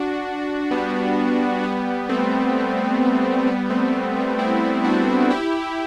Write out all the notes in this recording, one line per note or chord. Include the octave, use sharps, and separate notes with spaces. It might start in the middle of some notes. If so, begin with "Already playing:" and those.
Already playing: D4 F#4
G3 B3
G3 B3
A3 C4
G3 B3
A3 C4
G3
G3
C4 E4
D4 F#4
E4 G4